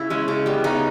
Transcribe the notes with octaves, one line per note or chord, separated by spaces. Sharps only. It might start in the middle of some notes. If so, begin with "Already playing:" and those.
Already playing: C#3 E4
G#3 C#4
C#3
G3 B3
C#3 D#4